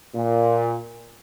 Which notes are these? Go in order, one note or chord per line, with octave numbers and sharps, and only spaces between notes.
A#2